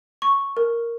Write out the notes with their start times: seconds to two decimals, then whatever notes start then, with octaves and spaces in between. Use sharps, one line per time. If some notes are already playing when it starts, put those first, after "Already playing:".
0.22 C#6
0.57 A#4